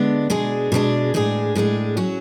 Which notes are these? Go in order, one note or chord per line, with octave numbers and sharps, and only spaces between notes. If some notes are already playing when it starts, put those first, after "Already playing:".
Already playing: D3 G#3 B3 D4
B2 G#3 D4 G#4
B2 G#3 D4 G#4
A2 G#3 D4 G#4
A2 G#3 D4 G#4
F#3 C#4 F#4